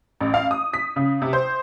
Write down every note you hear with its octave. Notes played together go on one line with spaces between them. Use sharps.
A1
F5
D#6
B6
C#3
C3
C5